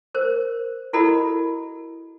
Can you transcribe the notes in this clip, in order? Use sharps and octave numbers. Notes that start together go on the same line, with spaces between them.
A#4 C5
E4 F#4 A4 A#4 D#5 B5